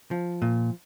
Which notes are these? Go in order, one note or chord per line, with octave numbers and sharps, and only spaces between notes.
F3
A#2